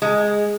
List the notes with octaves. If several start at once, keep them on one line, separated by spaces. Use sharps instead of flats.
G#3